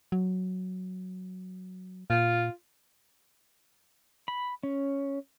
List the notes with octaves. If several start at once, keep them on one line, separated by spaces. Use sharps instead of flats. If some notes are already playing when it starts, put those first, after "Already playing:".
F#3
A#2 F4
B5
C#4